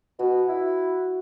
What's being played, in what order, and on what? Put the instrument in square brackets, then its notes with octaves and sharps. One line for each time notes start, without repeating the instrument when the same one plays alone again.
[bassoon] B2 [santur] F#4
[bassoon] E4